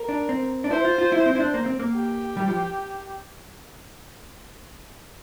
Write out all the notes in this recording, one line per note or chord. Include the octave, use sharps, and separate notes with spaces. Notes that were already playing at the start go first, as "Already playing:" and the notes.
Already playing: A#4
D4
C4
D4
E4 C5
F4
F4
E4
C4
E4
D4
A#3
C4
A#3
G4
G3
F3